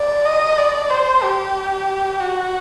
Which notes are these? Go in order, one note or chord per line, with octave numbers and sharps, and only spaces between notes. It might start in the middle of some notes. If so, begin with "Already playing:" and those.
Already playing: D5
D#5
D5
C5
G4
F#4